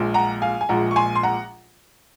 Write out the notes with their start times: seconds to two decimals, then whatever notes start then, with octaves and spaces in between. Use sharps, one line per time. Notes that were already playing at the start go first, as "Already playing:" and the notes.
Already playing: A#1 A#2 F3 G#3
0.14 F#5 A#5
0.42 F5 G#5
0.61 G#5
0.69 A#1 A#2 F3 G#3 F#5 A#5
0.91 C#6
0.96 G#5 C6
1.15 C6
1.23 F#5 A#5